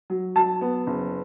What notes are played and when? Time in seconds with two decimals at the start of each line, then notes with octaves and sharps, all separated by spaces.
0.10 F#3
0.36 F#3 A5
0.61 B3
0.87 F#1